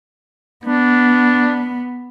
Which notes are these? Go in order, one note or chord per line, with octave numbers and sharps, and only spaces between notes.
B3 D4